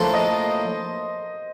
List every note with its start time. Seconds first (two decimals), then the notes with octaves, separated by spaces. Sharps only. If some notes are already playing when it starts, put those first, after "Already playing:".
Already playing: A2 F3 A#3 D4 A4 C5
0.14 D#5